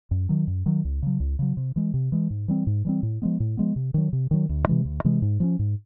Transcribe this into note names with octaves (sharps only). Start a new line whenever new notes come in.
F#2
D#3 F#3
F#2
D#3 F#3
C#2
C#3 F#3
C#2
C#3 F#3
C3
E3 G#3
C3
E3 G#3
G#2
E3 G3 C4
G#2
E3 G3 C4
A2
F3 G#3 B3
A2
F3 G#3 B3
C3
D#3 F#3
C3
D#3 F#3
D2
C3 E3 G#3
D2
C3 E3 G#3
G#2
F3 G#3 C#4
G#2